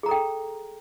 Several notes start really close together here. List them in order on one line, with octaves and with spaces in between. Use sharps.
G#4 A#5 A4 G5